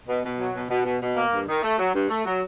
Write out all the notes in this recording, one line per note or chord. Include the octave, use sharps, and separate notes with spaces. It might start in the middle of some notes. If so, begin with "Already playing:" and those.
B2
B2
F#3
B2
B2
B2
B2
A#3
G2
D#3
A3
F#3
G2
A3
F#3